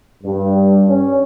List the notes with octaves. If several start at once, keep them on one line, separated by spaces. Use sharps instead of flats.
G2
C#4